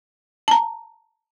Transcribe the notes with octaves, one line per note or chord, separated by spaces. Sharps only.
A5 A#5